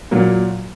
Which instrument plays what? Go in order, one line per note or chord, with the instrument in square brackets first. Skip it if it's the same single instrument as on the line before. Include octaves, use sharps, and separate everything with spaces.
[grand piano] A#2 F#3 A#3